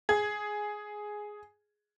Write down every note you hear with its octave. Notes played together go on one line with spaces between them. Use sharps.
G#4 G#6